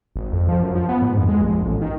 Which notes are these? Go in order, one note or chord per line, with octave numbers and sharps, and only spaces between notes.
G#1
F2
F3
F#2
F3
B3
G#2
F2
G#3
A#1
A1
D#3